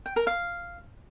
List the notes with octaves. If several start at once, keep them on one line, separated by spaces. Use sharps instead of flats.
G5
A#4
F5